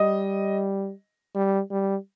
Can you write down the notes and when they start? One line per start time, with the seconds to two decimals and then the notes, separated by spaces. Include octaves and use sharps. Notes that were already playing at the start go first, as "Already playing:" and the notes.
Already playing: G3 D#5
1.35 G3
1.71 G3